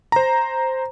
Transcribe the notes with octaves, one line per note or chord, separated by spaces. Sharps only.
C5 A#5